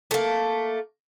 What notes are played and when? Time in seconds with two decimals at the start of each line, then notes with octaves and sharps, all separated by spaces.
0.11 A3 A#3